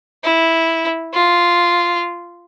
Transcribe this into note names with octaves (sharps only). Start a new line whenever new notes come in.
E4
F4